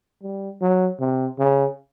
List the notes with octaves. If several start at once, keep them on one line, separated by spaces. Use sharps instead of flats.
G3
F#3
C3
C#3